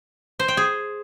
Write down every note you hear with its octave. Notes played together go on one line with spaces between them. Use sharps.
C5
G5
G#4